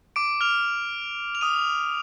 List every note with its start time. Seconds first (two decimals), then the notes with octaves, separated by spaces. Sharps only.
0.16 D6 D7
0.41 F6 F7
1.35 F7
1.41 D#6 D#7